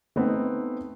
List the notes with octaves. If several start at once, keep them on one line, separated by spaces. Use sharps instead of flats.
A3 B3 C4 D#4